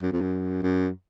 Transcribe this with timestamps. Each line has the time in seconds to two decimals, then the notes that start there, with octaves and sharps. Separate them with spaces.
0.02 F#2
0.12 F2
0.21 F#2
0.63 F#2